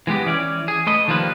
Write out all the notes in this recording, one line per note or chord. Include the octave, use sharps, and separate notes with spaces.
E3 G#3 B3 G4
E3 C#4 D5
G#4
A3 B4 D#5
D#3 F3 G3 A#3 B4